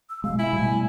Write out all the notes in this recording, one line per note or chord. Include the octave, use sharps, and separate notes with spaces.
E6
B2 G#3 F5
E4 G#5
B2 G3 A3